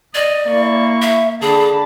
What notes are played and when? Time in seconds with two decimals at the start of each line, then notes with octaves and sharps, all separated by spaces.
0.15 D5 D#5
0.49 A#3 E4 C#6
1.02 E5
1.41 D3 G#4 A5 B5